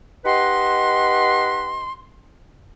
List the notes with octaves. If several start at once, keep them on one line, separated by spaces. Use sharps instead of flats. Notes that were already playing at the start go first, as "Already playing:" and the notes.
D#4 G4 B4 D#5 F#5 C6